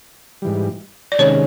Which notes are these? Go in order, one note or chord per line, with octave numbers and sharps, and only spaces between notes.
G#2 E3 G3
D5
C3 D#3 G#3 C#4 C#5